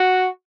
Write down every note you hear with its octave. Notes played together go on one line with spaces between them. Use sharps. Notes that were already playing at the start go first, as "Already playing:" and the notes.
Already playing: F#4